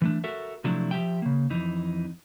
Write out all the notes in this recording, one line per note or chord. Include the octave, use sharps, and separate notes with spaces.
E3 A3 D4
F#4 A4 A#4 E5
C3 F3 F#3 A3 D4 E4
F3 G4 E5 G5
C#3 A#3
F2 E3 D#4